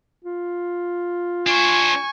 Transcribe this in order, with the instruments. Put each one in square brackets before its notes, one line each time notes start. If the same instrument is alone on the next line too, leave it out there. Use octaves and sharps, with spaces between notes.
[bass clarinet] F4
[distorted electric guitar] D4 C5 [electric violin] G#5 C#6